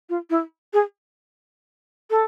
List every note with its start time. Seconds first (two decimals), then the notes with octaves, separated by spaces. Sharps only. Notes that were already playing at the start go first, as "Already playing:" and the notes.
0.09 F4
0.30 E4
0.73 G#4
2.10 A4